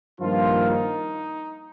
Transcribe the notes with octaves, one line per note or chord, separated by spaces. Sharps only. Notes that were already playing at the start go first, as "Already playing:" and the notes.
G2 D#3 F3 A#3 F4
D#4